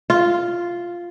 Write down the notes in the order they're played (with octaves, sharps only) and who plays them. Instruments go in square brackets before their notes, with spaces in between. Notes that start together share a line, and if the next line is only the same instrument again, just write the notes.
[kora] F4